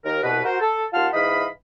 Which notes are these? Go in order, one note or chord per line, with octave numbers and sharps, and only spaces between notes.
D#2 A#4
C2 B2 B4
F#4 A#4 C5
A4
D#2 F4 F#5 A5 C6 F6
G#2 E3 D#5 F5 B5